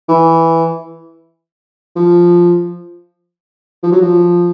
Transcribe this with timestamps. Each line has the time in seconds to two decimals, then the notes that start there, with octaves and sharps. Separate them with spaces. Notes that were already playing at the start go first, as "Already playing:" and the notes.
0.08 E3
1.96 F3
3.83 F3
3.92 F#3
4.02 F3